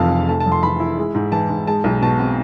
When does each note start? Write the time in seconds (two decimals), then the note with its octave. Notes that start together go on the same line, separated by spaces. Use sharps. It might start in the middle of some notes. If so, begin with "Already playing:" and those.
Already playing: F1 F2 E3 C4 F5 A5
0.11 F1
0.28 A3 A5
0.40 A5
0.46 F2
0.52 C6
0.63 E3 B5
0.80 E4
0.98 G#3
1.15 G#2
1.32 E3 A5
1.50 G#2
1.67 G#3 A5
1.84 B1
2.01 B2 A5
2.20 C4